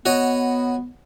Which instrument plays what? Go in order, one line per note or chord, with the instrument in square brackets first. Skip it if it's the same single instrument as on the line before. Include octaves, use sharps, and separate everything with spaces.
[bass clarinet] B3 [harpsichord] F#4 C#5 D#5